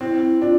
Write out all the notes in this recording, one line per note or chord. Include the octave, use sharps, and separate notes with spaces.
C4 E4
D4 F4